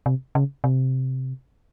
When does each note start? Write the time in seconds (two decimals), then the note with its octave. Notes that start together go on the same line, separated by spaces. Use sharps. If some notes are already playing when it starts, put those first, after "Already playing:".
0.06 C3
0.35 C#3
0.64 C3